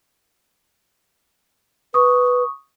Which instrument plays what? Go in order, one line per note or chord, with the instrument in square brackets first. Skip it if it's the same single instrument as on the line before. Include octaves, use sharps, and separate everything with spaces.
[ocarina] B4 [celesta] C#6 D#6